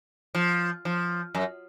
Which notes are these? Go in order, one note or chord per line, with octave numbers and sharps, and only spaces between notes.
F3
F3
F#2